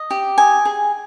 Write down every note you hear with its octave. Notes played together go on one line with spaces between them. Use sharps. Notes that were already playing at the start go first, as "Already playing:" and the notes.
Already playing: D#5
G4
D#5 G#5
G#4